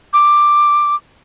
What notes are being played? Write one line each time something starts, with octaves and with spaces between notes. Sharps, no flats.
D6